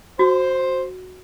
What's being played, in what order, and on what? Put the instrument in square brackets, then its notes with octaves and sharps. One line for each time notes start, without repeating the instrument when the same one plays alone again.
[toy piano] F#4 [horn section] C5